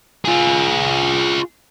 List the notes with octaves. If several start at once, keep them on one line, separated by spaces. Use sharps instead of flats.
F4 G#4